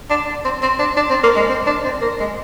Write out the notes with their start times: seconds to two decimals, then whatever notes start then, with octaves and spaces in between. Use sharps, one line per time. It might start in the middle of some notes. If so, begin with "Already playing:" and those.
0.10 D4
0.45 C4
0.62 C4
0.79 D4
0.97 D4
1.10 C4
1.23 A#3
1.36 G#3
1.49 C4
1.67 D4
1.85 C4
2.02 A#3
2.20 G#3